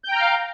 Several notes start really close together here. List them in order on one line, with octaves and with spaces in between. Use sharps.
G6 G5 A#5 F6 F5